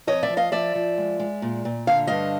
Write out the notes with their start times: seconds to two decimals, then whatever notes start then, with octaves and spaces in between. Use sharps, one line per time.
0.07 F2 C#5 D#5
0.23 D5 E5
0.30 F3
0.37 D#5 F5
0.52 F3 D5 E5
0.75 F3
0.98 G#3
1.20 G#3
1.42 A#2
1.65 A#2
1.87 D3 F5
2.07 G2 D#5 F5